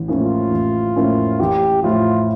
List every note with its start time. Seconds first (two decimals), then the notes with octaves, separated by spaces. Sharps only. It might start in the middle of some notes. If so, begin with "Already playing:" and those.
Already playing: A1
0.08 A2 F3 A#3 C#4
0.23 F4
0.51 A1
0.96 A2 F3 A#3 C#4
1.40 A1 G4
1.83 A2 F3 F4